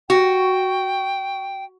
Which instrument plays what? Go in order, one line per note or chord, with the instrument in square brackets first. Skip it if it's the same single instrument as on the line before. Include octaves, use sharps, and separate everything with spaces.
[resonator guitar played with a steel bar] F#4 [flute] G5